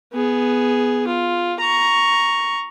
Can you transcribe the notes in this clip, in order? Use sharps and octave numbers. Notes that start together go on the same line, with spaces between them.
B3 G#4
F4
A#5 C#6